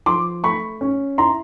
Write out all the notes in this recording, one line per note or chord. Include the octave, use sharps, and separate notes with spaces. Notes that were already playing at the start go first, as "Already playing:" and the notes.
F3 C6 D6
A3 B5 C#6
C#4
E4 A#5 C6